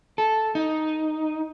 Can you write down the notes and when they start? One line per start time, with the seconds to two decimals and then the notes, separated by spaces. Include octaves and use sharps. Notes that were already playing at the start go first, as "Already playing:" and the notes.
0.18 A4
0.55 D#4